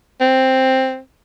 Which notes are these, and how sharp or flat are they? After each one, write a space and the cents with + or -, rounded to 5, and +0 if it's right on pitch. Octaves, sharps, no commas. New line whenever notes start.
C4 +5